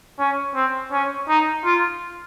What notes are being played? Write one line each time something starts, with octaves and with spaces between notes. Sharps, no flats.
C#4
C4
C#4
D#4
F4